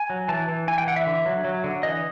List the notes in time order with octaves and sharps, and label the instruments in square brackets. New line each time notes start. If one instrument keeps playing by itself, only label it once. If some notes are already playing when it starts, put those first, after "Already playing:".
Already playing: [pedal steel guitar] G#5
F#3
E3 A5
E3
E3 G#5
G5
E3 F#5
E5
D3
F#3
F#3
D3
E3 D#5